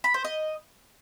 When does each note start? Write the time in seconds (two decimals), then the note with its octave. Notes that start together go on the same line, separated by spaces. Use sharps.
0.04 B5
0.14 C5
0.24 D#5